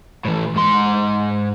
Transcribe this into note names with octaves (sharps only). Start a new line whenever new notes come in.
A2 E3
G#2 C6